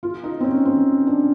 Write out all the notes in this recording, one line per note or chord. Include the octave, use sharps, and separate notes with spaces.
F4
D#4
C4
C#4
C4
D4